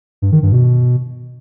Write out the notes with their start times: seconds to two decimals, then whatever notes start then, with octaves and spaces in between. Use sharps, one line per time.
0.22 G2
0.32 D#3
0.42 G2
0.52 B2